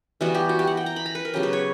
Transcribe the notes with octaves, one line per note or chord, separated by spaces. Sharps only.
E3 G3 B3 F#4
G4
F#4
G4
F#5
G5
A#5
B5
A#5
B4
A#4
C#3 F#3 B3 G4
B4
C#5